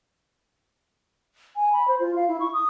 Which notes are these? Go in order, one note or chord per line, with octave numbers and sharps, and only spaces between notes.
G#5
B5
C5
F4
F5
E4
C#6
D#6